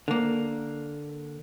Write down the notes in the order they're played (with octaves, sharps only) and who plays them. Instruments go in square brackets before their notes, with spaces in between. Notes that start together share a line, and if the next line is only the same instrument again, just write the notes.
[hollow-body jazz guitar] D3 A#3